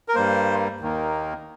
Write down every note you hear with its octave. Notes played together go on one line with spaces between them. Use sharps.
A#4
G2 G3 A#3 C5
D#2 D#3 A#3